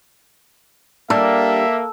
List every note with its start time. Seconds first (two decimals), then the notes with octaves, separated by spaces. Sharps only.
1.10 G3 A#3 D4 A4 E5